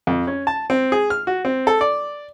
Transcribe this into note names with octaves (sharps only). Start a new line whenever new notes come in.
F2
C#4
A5
C4
G#4
F6
F#4
C4
A4
D5